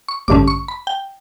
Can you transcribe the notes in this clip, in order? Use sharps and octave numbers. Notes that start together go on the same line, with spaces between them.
C#6
A1 G2 D3 A3 C#4 D6
C#6
B5
G5